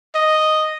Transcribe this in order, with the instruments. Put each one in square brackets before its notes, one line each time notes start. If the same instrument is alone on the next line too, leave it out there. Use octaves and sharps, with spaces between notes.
[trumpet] D#5